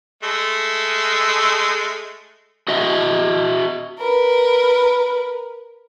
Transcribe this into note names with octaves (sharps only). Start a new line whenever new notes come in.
G#3 A3
F#4 D#5 E5
A#4 B4